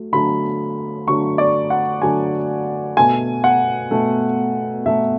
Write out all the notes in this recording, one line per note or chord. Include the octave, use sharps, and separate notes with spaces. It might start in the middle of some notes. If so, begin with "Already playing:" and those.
Already playing: F#3 A3
D3 F#3 A3 B5
D3 F#3 A3 C#6
D5
F#5
D3 F#3 A3 G#5
B2 A3 G#5
F#5
B2 A3
B2 A3 E5